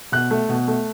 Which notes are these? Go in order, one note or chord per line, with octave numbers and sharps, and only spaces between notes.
B2 F#6
A3
B2
A3